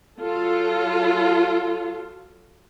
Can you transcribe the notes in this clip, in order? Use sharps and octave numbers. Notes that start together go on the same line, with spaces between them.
F#3 F4 A4